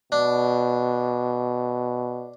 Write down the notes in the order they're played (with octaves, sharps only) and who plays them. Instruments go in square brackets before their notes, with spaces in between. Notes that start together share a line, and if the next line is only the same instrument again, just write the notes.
[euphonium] B2 [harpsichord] D4